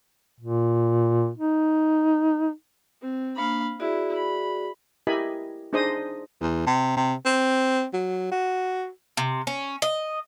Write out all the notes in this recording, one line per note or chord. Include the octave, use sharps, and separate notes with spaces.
A#2
D#4
C4
A#3 D4 F5 B5
E4 F#4 G#4 D5
B5
E4 G4 A#4 D#5 G#5 B5
D4 D#4 G#4 C5 D#5 D#6
E2
C3
C3
C4
F#3
F#4
C3
C#4
D#5